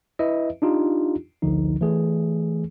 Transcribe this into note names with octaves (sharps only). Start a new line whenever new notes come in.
E4 B4 D#5 E5
D4 D#4 F4 G4
A1 D2 D3 F3 D#4
E3 A3 G#4